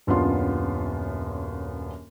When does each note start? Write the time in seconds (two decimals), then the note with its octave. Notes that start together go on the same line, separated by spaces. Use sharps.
0.07 D#1 F#2 B3 D4 F4 C6